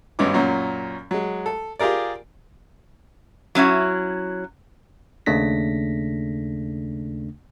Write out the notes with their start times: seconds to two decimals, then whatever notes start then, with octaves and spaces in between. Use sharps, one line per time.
0.19 G#1 G2 B3 C#4 D#4 D6
0.34 F#2 A#2 C#4
1.11 F#3 G#3
1.46 A4
1.79 F4 G4 G#4 A#4 D5
3.55 F#3 C#4 E4 F#4
5.26 D#2 C#3 A3 D4 A#6 B6